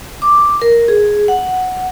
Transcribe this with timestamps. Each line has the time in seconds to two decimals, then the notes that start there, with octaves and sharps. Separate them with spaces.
0.22 D6
0.62 A#4
0.88 G#4
1.28 F#5